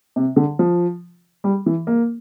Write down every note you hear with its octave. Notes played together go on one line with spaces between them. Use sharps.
C3
D3
F3
G3
E3
A#3